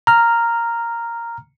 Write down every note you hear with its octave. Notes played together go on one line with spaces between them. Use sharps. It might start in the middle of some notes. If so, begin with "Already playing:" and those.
A#5 F6